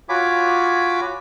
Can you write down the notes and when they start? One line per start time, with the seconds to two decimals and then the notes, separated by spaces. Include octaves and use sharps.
0.09 F4 F#4 C#5 G#5 B5 D6